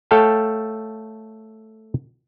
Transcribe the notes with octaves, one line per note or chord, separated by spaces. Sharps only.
A3 A4 C#5 F5 G5 A5